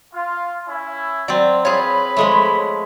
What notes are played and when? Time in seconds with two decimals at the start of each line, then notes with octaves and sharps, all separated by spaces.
0.14 F4
0.67 C#4 E4
1.28 F#3 C4 D5
1.65 F4 G#4 B4 C#5 B5
2.16 F3 G#3 A3